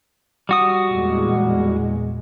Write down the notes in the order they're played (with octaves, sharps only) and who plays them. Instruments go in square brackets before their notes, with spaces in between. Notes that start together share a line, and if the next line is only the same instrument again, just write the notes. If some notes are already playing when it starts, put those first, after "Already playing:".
[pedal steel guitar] G3 F#4 D#6
[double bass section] E2 A#2 G#3